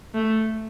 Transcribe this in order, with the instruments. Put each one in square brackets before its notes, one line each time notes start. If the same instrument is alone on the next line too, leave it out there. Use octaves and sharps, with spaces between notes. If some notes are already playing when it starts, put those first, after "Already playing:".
[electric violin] A3